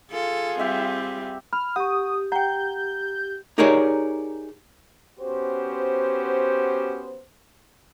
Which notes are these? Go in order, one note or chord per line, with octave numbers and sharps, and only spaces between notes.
F4 G#4 A4
G3 C4 G4 E5 F#5
B5 F6
G4 F#5 C#6 D#6
F#5 G5 A#5 G6
D#4 G4 G#4 A#4 C#5 D5
B3 C#4 F#4 G4 C5